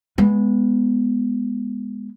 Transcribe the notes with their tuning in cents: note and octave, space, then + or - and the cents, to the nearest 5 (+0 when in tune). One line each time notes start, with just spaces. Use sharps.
G#3 +0 B3 +0